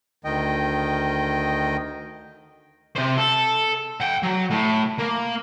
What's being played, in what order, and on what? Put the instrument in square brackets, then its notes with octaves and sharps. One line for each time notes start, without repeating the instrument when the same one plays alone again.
[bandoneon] D2 D#3 D#5 G5
[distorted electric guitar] C3 C5
A4
F#5 G5
F#3
A2
A#3